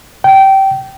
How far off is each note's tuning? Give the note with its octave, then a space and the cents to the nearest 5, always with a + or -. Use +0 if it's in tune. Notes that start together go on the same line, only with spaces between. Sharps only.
G5 -20